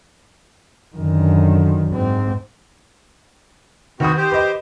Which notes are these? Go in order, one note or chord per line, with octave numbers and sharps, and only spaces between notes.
F#2 D3 D#3
G#2 C4
D#3 B3 C4 F#4 D#6
G4 C5
B4 D#5